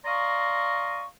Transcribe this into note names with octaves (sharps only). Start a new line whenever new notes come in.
D5 D#5 F5 A#5 C6 C#6